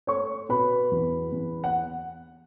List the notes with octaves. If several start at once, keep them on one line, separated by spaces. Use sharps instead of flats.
A3 C#5 C#6
B2 B4 B5
E2
E2
F#5